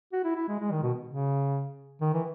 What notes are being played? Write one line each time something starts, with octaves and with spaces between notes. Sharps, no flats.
F#4
E4
E4
G#3
G#3
D#3
B2
C#3
D#3
E3